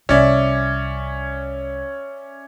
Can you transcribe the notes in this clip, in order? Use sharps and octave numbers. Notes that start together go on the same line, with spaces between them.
C2 C#4 D5 E5